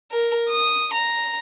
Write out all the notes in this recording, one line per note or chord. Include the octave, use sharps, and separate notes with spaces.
A#4
D#6
A#5